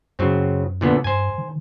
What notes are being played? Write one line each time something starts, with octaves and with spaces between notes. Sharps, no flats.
F#2 C#3 F#3 C4
A#2 D3 B3
G2 C5 G#5
D#3